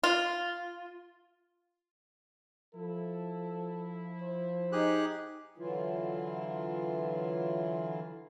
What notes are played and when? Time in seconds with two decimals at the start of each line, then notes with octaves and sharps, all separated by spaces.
0.04 F4
2.75 F3 E4 A4
4.22 C5
4.72 D#4 G4 G#4 F#6
5.58 D3 E3 F#3 E4 F4